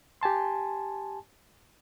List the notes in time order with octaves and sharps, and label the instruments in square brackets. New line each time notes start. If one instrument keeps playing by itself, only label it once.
[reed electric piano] G4 G#5 A5 C6